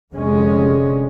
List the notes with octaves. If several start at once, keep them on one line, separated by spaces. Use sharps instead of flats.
F1 D3 G#3 C#4